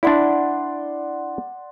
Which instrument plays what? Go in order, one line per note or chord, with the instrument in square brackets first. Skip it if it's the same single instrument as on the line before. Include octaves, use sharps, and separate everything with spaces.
[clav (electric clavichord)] D4 E4 [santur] D5 F#5 C6